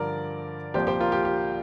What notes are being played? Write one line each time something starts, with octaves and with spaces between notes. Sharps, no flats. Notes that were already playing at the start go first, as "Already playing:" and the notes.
Already playing: G2 D3 F3 A#4 D5
C2 A#2 F3 G4 C5
G4 C5
F4 A#4
G4
G4